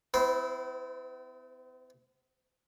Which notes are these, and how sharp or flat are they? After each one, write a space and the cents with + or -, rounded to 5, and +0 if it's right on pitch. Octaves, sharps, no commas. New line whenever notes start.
C4 -45 E4 +0 C5 +0